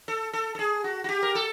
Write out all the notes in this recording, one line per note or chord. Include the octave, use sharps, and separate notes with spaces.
A4
A4
A4
G#4
F#4
F#4
G4
A#4
A4